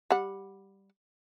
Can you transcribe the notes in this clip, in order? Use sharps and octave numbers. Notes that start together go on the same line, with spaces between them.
G3 F#5